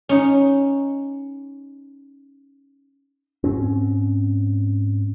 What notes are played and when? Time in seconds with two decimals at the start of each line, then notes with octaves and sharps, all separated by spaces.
0.09 C#4 D#4
3.44 G#2 C4 C#4